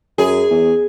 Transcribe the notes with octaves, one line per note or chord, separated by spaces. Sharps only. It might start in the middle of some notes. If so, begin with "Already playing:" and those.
F#2 G#4
E2